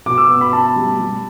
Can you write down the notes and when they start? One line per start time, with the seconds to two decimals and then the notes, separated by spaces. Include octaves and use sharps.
0.06 B2 D6
0.18 E6
0.30 B3
0.41 B5
0.53 B3 A5
0.76 G3
1.00 G3